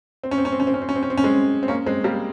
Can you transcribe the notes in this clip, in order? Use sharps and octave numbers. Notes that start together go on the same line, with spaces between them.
C4
C#4
C4
C#4
C4
C#4
C4
C#4
C4
C#4
C4
C#4
C4
C#4
G#3 C4
C4
A#3 C#4
G#3 C4
G3 A#3